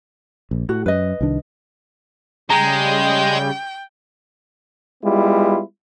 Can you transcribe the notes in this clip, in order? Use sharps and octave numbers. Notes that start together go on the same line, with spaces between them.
A#1
A2 F#4
F#2 B4 D#5
C2 D#3 D4
C#3 G3 G#3 G5 A#5
G3 G#3 B3 E4 F4